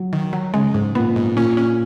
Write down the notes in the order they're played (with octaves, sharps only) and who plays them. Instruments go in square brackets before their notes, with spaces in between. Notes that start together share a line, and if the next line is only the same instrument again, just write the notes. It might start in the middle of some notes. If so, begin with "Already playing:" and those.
Already playing: [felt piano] F#3
[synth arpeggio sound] D#3
F#3
[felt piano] C#3 [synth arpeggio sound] G#3
[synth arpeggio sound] G#2
[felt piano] A#2 [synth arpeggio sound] B3
[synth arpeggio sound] G#2
[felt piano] A#2 [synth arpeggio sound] C#4
[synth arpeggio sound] C#4